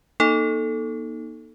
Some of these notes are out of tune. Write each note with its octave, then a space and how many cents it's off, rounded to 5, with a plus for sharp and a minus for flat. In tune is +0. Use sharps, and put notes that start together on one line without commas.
A#3 +40 D#4 +0 A4 +0